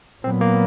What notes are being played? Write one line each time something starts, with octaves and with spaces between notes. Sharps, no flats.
A#2 F#3 B3 C4
A#3